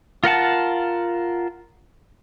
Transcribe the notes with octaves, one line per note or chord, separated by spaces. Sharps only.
F4 A#4 F#5 A5